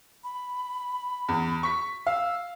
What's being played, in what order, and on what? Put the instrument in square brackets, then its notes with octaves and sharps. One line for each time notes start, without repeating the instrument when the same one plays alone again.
[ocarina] B5
[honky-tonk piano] E2
C#6 B6
[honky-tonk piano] F5 [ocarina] E6